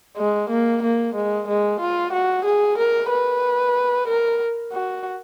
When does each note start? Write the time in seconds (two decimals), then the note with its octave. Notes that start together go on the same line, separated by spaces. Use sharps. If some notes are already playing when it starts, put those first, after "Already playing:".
0.18 G#3
0.49 A#3
0.83 A#3
1.15 G#3
1.48 G#3
1.80 F4
2.13 F#4
2.45 G#4
2.78 A#4
3.10 B4
4.08 A#4
4.73 F#4